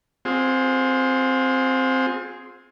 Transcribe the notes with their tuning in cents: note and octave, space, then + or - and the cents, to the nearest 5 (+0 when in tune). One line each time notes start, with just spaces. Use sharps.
C4 +0 F4 +40 G#4 +0